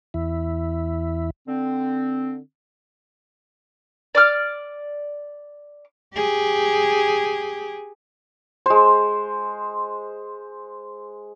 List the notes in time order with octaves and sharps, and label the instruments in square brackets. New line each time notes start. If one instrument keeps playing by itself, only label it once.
[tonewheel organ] E2 E4
[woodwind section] D3 C4
[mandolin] D5 D6 F6
[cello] G4 G#4
[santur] G#3 C5